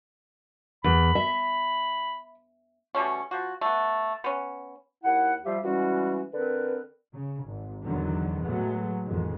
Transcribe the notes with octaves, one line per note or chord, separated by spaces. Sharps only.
E2 B5
E5
B2 G3 A3 C#4
F3 F#4
A3 B3
B3 C#4
D#2 E4 F#5
F3 G3 G4 E5 F5
E3 G3 G#3 C#4 F#4
D3 C4 A#4 B4
C#3
G#1
E2 D3 D#3 F#3
A2 F#3 G#3 A3 B3
A1 F2 D#3 G#3